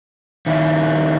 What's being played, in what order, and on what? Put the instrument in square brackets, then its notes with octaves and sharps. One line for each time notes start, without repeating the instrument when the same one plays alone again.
[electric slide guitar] D#3 A#3 E4